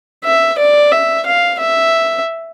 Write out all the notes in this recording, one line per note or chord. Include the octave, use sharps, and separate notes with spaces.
E5
D5
E5
F5
E5